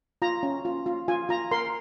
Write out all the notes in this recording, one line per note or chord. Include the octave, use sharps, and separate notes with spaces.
F4 A#5
C#4
F4
F4
F4 G#5
F4 A#5
A#4 C6